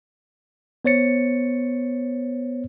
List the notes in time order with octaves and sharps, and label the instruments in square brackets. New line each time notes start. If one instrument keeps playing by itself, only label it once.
[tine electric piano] B3 C5 C#5 A6 C#7